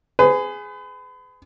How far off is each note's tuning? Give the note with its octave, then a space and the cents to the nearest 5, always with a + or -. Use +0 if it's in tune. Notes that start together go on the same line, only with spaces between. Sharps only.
G#4 +0 B4 +35